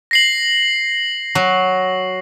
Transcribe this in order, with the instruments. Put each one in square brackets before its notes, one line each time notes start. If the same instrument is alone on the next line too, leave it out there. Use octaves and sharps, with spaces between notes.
[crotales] A#6 C7 F#7
[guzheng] F#3